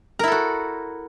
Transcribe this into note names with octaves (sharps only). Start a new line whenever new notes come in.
E4 F#4 A4 A#4